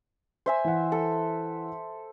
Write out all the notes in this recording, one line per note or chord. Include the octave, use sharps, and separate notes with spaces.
C5 E5 G#5
E3 F#5
A4